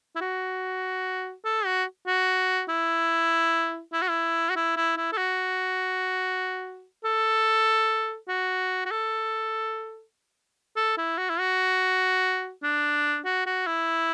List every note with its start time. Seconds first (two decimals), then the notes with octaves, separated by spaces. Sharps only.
0.16 E4
0.21 F#4
1.45 A4
1.65 F#4
2.07 F#4
2.69 E4
3.93 E4
4.02 F#4
4.10 E4
4.50 F#4
4.56 E4
4.76 E4
4.97 E4
5.12 A4
5.17 F#4
7.05 A4
8.28 F#4
8.85 F#4
8.91 A4
10.77 A4
10.97 E4
11.18 F#4
11.30 E4
11.40 F#4
12.63 D4
13.25 F#4
13.46 F#4
13.67 E4